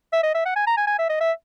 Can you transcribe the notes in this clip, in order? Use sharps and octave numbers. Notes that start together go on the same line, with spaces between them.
E5
D#5
E5
F#5
G#5
A#5
G#5
G#5
E5
D#5
E5